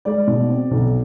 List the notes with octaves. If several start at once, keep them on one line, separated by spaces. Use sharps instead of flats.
G#3 D5
B2
C4
B1